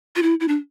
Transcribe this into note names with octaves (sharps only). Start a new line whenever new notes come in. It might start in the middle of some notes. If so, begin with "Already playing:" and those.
F4
E4
E4
D4